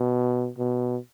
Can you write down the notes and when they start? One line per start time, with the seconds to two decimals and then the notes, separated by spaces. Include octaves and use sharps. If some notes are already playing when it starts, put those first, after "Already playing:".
Already playing: B2
0.58 B2